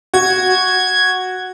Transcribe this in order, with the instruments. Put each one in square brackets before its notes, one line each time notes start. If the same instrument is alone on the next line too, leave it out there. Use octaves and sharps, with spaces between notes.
[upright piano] F#4 [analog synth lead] G#6